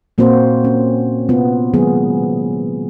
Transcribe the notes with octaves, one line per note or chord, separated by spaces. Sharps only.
A#2 A#3 C4 F#4 C5
C#4
C3 B3 F4
D#3 F#3 G#3 A#3 B3 G#4